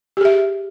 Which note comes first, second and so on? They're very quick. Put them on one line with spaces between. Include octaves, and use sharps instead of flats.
G4 G#4 E5